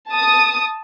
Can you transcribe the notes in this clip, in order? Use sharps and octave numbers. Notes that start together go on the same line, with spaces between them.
A5 D#6